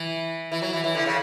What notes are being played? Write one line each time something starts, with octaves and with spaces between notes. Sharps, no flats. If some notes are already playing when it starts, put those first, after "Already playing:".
Already playing: E3
E3
F#3
E3
E3
D3
C#3